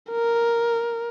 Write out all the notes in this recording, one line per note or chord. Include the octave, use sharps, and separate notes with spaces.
A#4